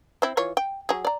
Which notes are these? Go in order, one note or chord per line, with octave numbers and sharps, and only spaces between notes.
C4 E4
E3 F4 C#5
G5
F#3 G#4
D5 A#5